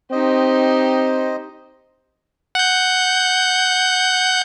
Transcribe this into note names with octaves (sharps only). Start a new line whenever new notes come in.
C4 D#4 G4 C5 D#5
F#5 G6